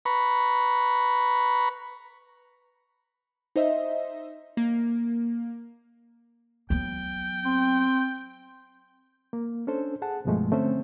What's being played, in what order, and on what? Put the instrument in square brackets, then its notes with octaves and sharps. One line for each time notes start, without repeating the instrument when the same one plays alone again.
[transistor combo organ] B4 A#5 B5 C#6
[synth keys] D#4 C5 D#5 E5
A#3
[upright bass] F#3 B3 [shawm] G5
[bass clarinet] C4
[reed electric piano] A#3
C#4 D4 A4 C5
G#4 F#5 A5
C2 G2 B2 F3 G#3 A3
D3 A3 C4 C#4 C5